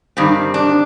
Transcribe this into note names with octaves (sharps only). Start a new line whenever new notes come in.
G2 D#3 G3 C4
D4